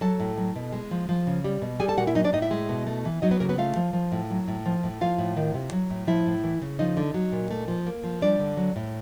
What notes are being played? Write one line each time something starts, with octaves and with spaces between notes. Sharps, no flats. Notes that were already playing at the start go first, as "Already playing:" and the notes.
F#3 A4 A5
A2
F#3
B2
G#3
F3
F3
C#3
G3
B2
G3 G#4 G#5
A4 A5
A#2 F#4 F#5
E4 E5
F#3 D#4 D#5
D4 D5
A2 D#4 D#5
E4 E5
G#3
B2
A3
E3
F#3 D#4 D#5
B3 B4
C#3 A#3 A#4
B3 B4
A3 F4 F5
F3
F3
A2
F#3
A2
F3
A2
F3 F4 F5
A2
D#3
C3
F#3
A2
F3 E4 E5
A2
E3
C#3
F3 D#4 D#5
D3
F#3
A#2
A3
F3
A#3
F3
G3 D4 D5
D3
F#3
A2